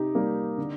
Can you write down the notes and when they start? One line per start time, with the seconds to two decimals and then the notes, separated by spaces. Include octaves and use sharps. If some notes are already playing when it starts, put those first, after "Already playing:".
Already playing: C3 D#4 G4
0.15 G3 A#3
0.58 D3